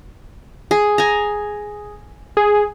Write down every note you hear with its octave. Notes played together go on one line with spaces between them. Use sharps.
G#4
G#5 A#5
G#4